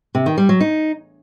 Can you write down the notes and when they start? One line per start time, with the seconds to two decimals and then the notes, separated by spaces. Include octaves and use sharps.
0.15 C3
0.26 D#3
0.38 G3
0.49 F#3
0.60 D#4